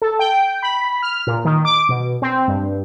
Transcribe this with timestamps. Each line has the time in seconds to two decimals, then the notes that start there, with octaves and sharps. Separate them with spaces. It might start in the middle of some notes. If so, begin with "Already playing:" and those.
0.02 A4
0.19 G5
0.63 B5
1.02 F6
1.27 A#2
1.45 D#3
1.65 D6
1.89 B2
2.22 C4
2.48 G2